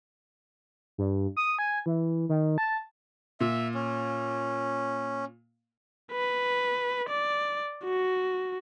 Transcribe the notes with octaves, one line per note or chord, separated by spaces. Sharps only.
G2
D#6
G#5
E3
D#3
A5
A#2 E5
C#4
B4
D5
F#4